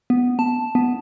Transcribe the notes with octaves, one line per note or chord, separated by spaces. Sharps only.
B3
A5
B3